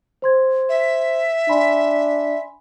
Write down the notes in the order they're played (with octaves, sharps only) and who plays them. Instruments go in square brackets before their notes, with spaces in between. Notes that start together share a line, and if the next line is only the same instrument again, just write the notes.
[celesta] C5 C6 G#6
[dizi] E5
[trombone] D4 [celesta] G#5 B5 C6